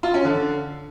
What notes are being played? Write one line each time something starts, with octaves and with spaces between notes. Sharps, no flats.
F4
C#4
D3